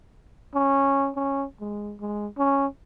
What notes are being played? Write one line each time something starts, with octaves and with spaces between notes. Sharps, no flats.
C#4
C#4
G#3
G#3
C#4